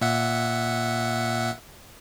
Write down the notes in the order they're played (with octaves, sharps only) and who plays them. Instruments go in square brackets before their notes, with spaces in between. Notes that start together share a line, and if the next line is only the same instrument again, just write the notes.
[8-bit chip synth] A#2 E5 F#5